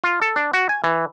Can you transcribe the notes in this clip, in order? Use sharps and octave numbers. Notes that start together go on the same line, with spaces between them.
F4
A4
D4
F#4
G#5
E3